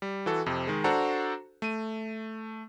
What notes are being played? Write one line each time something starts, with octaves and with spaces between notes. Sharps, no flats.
G3
E3 F#4 A4
F2 C3
D#3 G#3
D4 F#4 A4 C5 F#5 A#5
A3 D#7